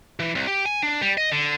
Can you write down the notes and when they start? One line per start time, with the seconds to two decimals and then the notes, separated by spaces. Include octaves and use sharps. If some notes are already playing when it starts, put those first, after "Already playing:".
0.20 E3
0.35 C2
0.47 G4
0.65 G#5
0.83 D4
1.02 G3
1.18 D#5
1.32 D3